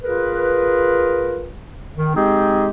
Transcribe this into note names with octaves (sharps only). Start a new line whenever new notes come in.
F4 G#4 A#4 B4
D#3
G#3 C4 D#4 G4 G#4